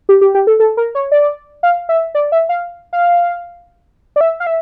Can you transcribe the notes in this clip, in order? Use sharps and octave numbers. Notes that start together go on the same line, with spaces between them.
G4
G4
G4
A4
A4
A#4
C#5
D5
F5
E5
D5
E5
F5
F5
D5
E5
F5
E5